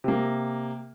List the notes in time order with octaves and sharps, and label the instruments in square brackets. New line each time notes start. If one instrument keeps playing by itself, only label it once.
[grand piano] C3 A#3